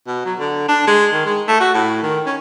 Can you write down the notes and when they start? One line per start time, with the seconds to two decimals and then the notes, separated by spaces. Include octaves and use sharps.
0.07 B2
0.25 F#3
0.39 D3
0.68 D4
0.87 G#3
1.13 D#3
1.25 G#3
1.48 A3
1.60 F#4
1.74 A2
2.03 D#3
2.26 C#4